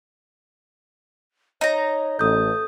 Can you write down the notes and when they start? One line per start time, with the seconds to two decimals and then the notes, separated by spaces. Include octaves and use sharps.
1.61 D#4 C#5 A#5
2.19 A1 A4 D#6 G6